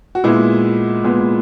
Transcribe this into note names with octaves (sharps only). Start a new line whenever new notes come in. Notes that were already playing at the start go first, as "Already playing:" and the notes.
F#4
A#2 G#3 B3 E4
A#2 G#3 B3